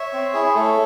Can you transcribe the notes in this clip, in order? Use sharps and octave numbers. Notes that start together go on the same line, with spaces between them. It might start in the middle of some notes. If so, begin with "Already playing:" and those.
Already playing: C#5 E5
C4
E4 G#4
A3 A4 C#5